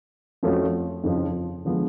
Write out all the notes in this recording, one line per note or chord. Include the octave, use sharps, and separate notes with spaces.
F2 F3 A3 C#4 F#4
F2 C#3 F3
D3 F3 G#3 B3